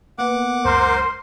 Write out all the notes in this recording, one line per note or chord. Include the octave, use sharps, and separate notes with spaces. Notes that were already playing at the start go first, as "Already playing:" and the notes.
A#3 B3 F#5 D6
C#2 F#2 A#4 C5 C6